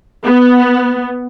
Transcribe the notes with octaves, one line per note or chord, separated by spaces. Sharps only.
B3